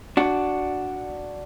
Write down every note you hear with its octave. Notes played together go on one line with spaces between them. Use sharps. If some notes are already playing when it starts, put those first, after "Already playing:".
D4 F#4